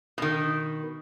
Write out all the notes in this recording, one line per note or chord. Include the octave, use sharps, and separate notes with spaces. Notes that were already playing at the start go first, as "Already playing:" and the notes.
B2 D#3